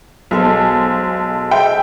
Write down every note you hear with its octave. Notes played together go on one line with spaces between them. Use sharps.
B1 G#3 A4 C5
G#3 E5 G5